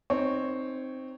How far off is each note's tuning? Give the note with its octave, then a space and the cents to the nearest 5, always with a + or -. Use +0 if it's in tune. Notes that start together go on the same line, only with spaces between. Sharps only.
C4 +0 D#4 -10 C#5 +0